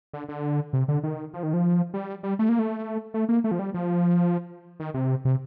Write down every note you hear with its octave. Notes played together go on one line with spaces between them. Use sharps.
D3
D3
C3
D3
D#3
F3
D#3
F3
G3
G3
A3
A#3
A3
A3
A#3
A3
F3
G3
F3
D#3
C3
C3